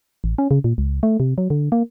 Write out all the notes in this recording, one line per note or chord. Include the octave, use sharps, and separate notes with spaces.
A1
C#4
C#3
A#2
C#2
A3
C3
F#3
D3
A#3